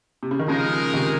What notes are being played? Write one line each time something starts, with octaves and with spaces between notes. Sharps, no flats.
C3
C#3
D#3
C#3 F3 G#3 D#4 A#4
C3 D#3